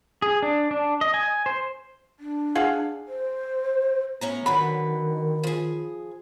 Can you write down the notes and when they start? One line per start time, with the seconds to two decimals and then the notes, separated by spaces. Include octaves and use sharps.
0.22 G#4
0.43 D4
0.71 D4
1.01 D#5
1.14 G#5
1.46 C5
2.20 D4
2.55 G#4 F5 F#5
3.08 C5
4.21 A2 B3 C#4 A#5
4.46 D3 D#3 F#3 B4 B5
5.43 F3 G#4